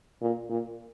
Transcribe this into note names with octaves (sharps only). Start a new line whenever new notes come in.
A#2
A#2